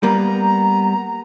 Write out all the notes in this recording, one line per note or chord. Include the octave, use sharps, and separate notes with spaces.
G3 A#3 B3 A#5